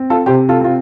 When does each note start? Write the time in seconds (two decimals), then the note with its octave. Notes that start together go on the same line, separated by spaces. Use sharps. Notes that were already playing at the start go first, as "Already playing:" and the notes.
Already playing: C4
0.10 F4 A4
0.26 C3 G4 C5
0.49 F4 A4
0.61 C4 F4